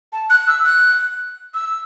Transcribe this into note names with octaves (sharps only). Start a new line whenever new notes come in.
A5
F#6
E6
F#6
E6